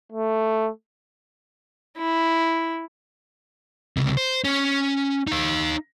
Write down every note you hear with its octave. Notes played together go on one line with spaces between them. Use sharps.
A3
E4
C#2 C3
C5
C#4
D#4 F5